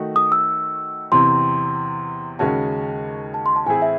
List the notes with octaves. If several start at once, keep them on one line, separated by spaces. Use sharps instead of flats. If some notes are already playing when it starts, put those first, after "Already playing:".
Already playing: D#3 A3 D#4 F#4
D#6
E6
E2 C3 E3 C4 C6
D#2 C#3 G#3 C#4 F#4 A5
A5
C6
A5
A2 E3 C4 E4 G#4 G#5
E5